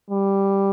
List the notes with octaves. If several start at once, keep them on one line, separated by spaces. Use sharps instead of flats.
G3